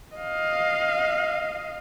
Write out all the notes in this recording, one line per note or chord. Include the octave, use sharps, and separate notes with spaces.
D#5 F5